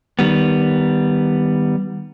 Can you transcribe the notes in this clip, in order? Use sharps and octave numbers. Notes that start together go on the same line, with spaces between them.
D#3 G3 B3